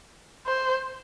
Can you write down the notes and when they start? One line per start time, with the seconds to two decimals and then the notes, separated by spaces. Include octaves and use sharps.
0.46 C5